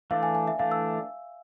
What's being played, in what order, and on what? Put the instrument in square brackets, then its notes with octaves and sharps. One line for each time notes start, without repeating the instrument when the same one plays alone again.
[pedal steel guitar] E3 A3 D4 [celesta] F5
[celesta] G#5
G#5
E5
[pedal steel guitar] E3 A3 D4 [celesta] F5
[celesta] E6